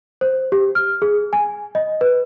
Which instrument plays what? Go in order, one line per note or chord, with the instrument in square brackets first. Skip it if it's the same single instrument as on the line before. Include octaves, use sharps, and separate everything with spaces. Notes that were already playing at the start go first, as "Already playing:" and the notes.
[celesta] C5
G4
F6
G#4
G#5
D#5
B4